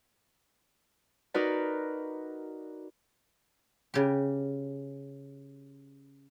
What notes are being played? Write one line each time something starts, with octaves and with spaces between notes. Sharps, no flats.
D#4 F#4 A#4 B4 D5
C#3 G4